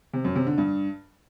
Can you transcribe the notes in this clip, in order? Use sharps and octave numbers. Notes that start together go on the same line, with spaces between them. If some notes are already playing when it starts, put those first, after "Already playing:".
C3
F#2
C3
D3
G2